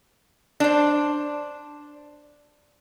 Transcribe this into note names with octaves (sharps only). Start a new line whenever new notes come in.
D4 C5